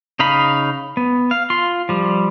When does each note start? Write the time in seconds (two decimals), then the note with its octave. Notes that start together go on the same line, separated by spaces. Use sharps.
0.19 C#3 D#4 F5 B5
0.97 B3
1.31 F5
1.50 F4 C6
1.89 F3 G3